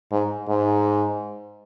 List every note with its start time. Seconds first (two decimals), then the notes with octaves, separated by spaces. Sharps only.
0.11 G#2
0.49 G#2